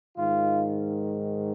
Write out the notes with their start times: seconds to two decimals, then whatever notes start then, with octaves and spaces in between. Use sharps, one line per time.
0.17 G#2 D#3 F4